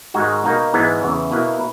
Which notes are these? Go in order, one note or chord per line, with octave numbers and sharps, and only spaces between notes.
G#2 D#3 G#3 D#4 F#4
B2 A#3 D#4 F#4
G#2 E3 G#3 B3
E2 C#3 E3 B3
B2 A#3 E4 B4